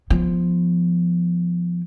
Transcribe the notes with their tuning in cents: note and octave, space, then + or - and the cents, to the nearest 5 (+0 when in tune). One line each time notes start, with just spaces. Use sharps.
F3 +0 B3 +0